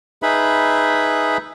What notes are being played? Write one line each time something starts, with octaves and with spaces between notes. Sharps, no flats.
D#4 G#4 B4 E5 B5